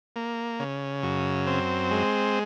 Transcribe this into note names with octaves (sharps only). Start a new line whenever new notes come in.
A#3
C#3
F#2
C4
G#3